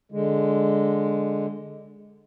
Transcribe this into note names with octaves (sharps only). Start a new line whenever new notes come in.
D3 G#3